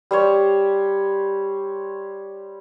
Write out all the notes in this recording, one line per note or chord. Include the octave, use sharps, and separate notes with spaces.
G3 C5 C#5